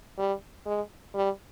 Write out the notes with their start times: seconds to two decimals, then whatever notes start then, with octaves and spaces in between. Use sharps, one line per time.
0.18 G3
0.66 G#3
1.14 G3